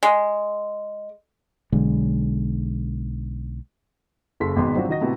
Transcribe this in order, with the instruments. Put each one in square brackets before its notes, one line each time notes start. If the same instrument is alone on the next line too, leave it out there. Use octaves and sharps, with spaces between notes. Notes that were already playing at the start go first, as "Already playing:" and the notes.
[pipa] G#3
[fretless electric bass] B1 D3 G#3
[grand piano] F#1 C#3 A4 C6 B6
G#1 B2 D#3 G#3 B3 C6
F#3 G3 C4 D4 F4 F#4
D#3 F#4 D#5 A#6
A2 C3 B3 E4 F#4 A4